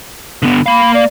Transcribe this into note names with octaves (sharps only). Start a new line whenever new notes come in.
D3 B3
A#3 F5 B5
D5